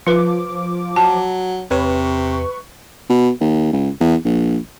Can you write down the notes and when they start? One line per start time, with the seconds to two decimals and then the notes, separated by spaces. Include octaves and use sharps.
0.07 F3 F4 B4 D6
0.96 F#3 A5
1.71 E2 C3 B4 C#5 C#6
3.09 B2
3.41 D#2
3.73 C#2
4.00 E2
4.25 A#1